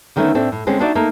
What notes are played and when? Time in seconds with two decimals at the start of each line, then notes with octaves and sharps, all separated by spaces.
0.16 D3 D#3 G3 A3 B3 C#4
0.35 A2 A3 C4 D4
0.52 A2
0.67 D3 G#3 C4 C#4
0.80 D4 D#4 F#4 D5 E5
0.95 A3 A#3 D#4